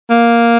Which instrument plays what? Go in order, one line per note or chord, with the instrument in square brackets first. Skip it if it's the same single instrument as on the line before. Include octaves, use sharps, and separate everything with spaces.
[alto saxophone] A#3